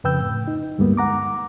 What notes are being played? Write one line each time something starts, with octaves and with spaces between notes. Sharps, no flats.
F2 C#3 B4 G5 E6 G6
A2
D#4
D2 G2 G3 G#3 A#3 B3
F#5 A#5 D6